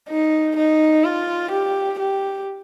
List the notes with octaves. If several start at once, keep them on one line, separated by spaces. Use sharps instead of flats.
D#4
D#4
F4
G4
G4